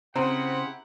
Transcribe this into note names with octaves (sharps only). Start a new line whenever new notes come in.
C#3 C4 E4 G4 F#5 A#5